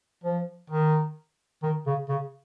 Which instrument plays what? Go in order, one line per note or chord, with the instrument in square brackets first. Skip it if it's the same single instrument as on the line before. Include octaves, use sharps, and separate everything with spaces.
[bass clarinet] F3
D#3
D#3
C#3
C#3